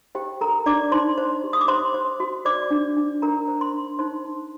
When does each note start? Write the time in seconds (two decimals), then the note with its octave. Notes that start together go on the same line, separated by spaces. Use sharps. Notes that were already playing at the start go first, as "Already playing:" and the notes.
0.15 G4 C5 G5
0.41 A4 A#4 A#5
0.66 D4 D5 D6
0.92 D#4 C5 C6
1.18 C5
1.44 G4
1.53 D#6
1.61 D6
1.68 C5 C6
1.94 C5
2.20 F#4
2.45 C5 D5 D6
2.71 D4
2.97 D4
3.22 D4 A#4 A#5
3.48 C5
3.61 C5 C6
3.73 D4
3.99 D#4 C5 C6
4.25 D#4